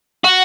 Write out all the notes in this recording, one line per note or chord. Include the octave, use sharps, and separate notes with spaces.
F#4